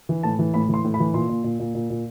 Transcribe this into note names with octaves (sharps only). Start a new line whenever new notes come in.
E3
A2 A5
E3
A2 B5
E3 C6
A2
B5
E3
A#2 C6
A#2
A#2
A#2
A#2
A#2